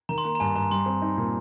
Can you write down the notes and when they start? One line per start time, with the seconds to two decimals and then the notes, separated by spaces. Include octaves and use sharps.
0.09 D#3 A#5
0.18 C6
0.25 A#3 A#5
0.35 A#5
0.40 G2 G#5
0.56 G2 A#5
0.71 G3 C6
0.86 C4
1.02 D#4
1.17 A#2